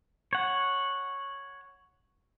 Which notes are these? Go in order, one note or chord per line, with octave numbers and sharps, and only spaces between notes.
C#5 F#5